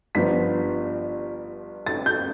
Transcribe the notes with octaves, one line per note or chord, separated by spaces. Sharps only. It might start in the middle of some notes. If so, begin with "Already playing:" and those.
G1 G2 F3 B3 B6
A6
G6